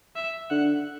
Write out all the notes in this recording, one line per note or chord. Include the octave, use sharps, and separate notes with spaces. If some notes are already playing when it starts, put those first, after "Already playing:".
E5
D3 F#5